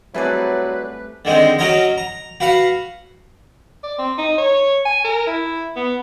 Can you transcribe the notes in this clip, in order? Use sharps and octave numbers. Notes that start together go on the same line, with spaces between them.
F#3 G3 A3 C4 E4 G#4 B4 D5
D3 D#3 G#3 C4
F#3 C#4 F#4 A#4 C#5 D#5
A#5
F#4 B4 F5 F#5
D5
C4
D#4
C#5
G#5
A#4
E4
B3